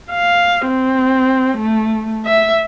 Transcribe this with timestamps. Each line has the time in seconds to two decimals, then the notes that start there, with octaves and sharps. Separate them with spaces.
0.11 F5
0.68 C4
1.58 A3
2.26 E5